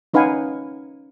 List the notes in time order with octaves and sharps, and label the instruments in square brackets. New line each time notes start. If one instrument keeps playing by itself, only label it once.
[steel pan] C#4 D#4 B4 F5 F#5 G#5